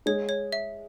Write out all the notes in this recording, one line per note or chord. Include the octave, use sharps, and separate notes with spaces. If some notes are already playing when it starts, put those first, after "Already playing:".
G#3 C#5
C#5
E5